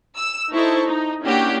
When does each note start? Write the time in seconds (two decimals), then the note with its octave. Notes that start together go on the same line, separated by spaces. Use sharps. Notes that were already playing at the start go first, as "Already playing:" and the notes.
0.16 E6
0.52 D#4 E4 A4 C5 C#6
0.85 D#4
1.23 A#3 C#4 D4 E4 F#4 G4